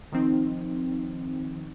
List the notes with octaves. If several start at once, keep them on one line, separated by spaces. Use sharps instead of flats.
D#3 F3 C4 D#4